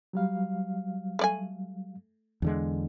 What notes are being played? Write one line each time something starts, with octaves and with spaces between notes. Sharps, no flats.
F#3 G3 F5
A3 D5 G#5
E2 D3 G#3